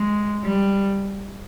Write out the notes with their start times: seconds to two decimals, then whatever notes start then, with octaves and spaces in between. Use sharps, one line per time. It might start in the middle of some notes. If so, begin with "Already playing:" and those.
Already playing: G#3
0.44 G3